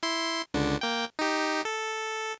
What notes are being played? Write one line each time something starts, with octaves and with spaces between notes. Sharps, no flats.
E4 C6
C#2 D3 D4
A#3 G5
D#4 G4
A4